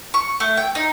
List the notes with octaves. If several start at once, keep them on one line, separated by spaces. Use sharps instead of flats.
C#6
A3
G5
D#4